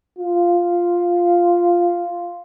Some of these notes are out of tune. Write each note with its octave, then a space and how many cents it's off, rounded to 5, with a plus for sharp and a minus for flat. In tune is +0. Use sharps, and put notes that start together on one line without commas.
F4 +0